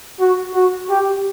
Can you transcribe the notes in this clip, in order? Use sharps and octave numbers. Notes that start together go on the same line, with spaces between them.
F#4
F#4
G4